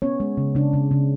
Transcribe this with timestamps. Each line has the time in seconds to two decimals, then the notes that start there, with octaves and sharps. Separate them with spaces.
0.02 B3 C#4 C#5
0.20 G#3
0.37 C#3
0.55 C#3 D4
0.73 C#3
0.91 C#3